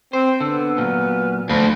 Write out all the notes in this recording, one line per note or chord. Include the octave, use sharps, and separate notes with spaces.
C4 C5
D3 B3 E6
A#2 F#3 F6
D2 F3 B5